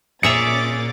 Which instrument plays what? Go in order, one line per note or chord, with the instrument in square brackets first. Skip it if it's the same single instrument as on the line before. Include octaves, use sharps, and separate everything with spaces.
[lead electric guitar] A#2 [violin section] C#4 D6 A6 [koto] G#4 E5 [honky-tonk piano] C#7 F7